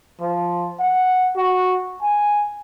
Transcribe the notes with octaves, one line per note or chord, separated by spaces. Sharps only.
F3
F#5
F#4
G#5